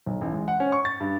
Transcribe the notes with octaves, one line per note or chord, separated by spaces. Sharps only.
B1
A1
G#3
F#5
C#4
C#6
A6
G2